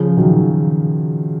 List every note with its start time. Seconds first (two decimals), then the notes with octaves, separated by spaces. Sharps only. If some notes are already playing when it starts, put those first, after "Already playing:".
Already playing: C#3 F3
0.17 D#3 F#3